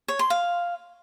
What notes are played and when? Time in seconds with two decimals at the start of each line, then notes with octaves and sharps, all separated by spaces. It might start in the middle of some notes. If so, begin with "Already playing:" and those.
0.08 C#5
0.19 C6
0.30 F5